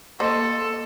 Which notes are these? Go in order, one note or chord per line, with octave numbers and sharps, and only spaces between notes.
A#3 A4 C5 D#5